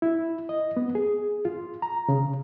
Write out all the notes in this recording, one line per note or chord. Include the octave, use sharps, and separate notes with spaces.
E4
D#5
B3
G#4
F4
A#5
C#3